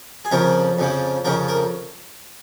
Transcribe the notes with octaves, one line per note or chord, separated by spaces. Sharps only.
G#4
F2 C#3 F3 A#4
F2 C#3 F3
F2 C#3 F3 A#4
A#4